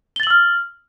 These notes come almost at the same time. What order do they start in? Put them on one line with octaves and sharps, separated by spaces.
G7 A6 F#7 E6 F6